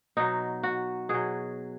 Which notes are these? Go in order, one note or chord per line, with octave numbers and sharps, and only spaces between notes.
B2 F#3 D#4
F#4
B2 F#3 G#4